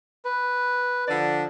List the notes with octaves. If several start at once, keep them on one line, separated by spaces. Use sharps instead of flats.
B4
D3 F3 D5